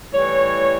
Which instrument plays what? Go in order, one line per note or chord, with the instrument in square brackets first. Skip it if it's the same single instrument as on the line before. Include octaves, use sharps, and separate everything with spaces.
[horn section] A2 E3 G3 C#5